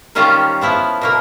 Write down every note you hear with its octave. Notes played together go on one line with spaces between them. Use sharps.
D#3 G3 C#4 F4 C5 A#5
F3 B3 E4
B2 A#3 A#4